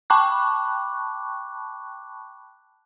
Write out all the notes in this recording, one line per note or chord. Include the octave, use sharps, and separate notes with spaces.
G5 A5 B5 C#6 D6 F#6